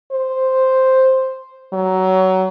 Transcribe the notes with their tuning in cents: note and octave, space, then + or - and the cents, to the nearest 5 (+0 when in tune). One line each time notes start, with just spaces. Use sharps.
C5 +0
F#3 +20